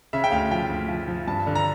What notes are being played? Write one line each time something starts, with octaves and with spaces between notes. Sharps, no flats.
C#3 E5
G5
D2 F5
F3 G5
D2
F3
F3
G2 A5
D3
A#5